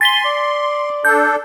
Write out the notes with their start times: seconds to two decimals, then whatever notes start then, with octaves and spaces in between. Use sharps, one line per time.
0.01 G#5 C6 A6 B6 G7
0.25 D5
1.05 D4 A4 G6